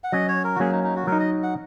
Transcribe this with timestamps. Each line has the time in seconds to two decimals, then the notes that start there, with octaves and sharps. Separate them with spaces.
0.04 F#5
0.12 F#3 C#4 D#5
0.28 C#5
0.44 A#4
0.55 F#4
0.60 F#3 A#3 C#4 G#4
0.72 D#4
0.84 D#4
0.96 F#4
1.07 F#3 A#4
1.12 D#4
1.20 D#5
1.43 F#5